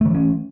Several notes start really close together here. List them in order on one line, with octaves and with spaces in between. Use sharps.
A3 D#3 E3 C#4